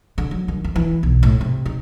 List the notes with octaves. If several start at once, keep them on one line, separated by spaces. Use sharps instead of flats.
D3
F#3
D#3
F2
E3
B1
A2
C3
D#4